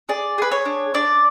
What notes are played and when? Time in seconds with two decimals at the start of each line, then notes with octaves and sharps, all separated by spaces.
0.09 G#4 D5
0.38 G#4 B4
0.51 C#5
0.65 D4
0.94 D4 D5